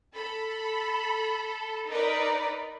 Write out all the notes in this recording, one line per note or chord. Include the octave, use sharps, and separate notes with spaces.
A4 B5
D#4 A#4 B4 D5